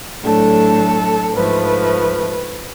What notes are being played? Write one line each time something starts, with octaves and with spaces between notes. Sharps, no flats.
A2 F#3 A3 D4 A4
G#2 F3 A3 B4